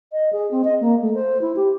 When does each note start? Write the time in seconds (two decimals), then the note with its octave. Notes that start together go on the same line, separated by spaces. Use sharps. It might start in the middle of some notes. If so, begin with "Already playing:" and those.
0.12 D#5
0.33 G#4
0.51 C4
0.64 D#5
0.81 A#3
1.02 A3
1.14 C5
1.41 E4
1.56 G4